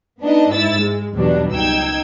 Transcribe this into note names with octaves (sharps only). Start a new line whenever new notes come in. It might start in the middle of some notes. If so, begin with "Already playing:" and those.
B3 D4 D#4 D#5
G#2 E4 E6 A6
G#3
E2 B2 F#3 G3 D4
C#2 D#4 G5 E6 G#6